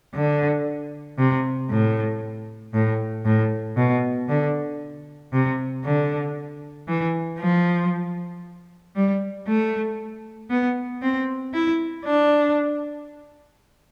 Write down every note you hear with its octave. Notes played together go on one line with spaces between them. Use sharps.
D3
C3
A2
A2
A2
B2
D3
C3
D3
E3
F3
G3
A3
B3
C4
E4
D4